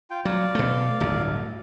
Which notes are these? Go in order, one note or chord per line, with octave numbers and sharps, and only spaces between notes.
F4 G5
F#3 D5 F5
B2 A3
D1 G1 D2